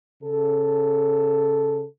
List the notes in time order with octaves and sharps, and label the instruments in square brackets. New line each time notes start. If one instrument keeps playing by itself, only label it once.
[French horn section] C#3 A4